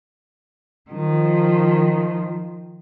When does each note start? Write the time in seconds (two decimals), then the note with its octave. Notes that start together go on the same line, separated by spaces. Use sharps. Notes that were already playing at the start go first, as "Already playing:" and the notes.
0.91 D#3 F3